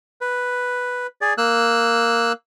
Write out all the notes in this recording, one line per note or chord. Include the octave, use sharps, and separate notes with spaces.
B4
G#4 D5
A#3 E6 F#6